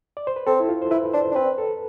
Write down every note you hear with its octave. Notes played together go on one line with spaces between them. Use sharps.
D5
C5
B4
C4 A4
E4
F4
C5
E4 B4
D4 C5
D4
C4 B4
A4